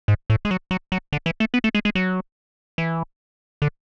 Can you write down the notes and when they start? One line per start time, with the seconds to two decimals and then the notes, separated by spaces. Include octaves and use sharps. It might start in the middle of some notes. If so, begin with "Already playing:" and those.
0.08 G#2
0.30 A2
0.45 G#3
0.51 F#3
0.71 F#3
0.92 F#3
1.13 D3
1.26 E3
1.40 A3
1.54 B3
1.64 A3
1.75 G#3
1.85 G#3
1.95 F#3
2.78 E3
3.62 D3